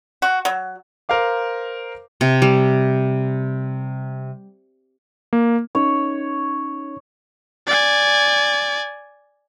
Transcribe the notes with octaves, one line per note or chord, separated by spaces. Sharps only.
F#4
F#3
A#4 C5 F5 D6
C3
G3
A#3
C#4 D#4 C#5
D5 G#5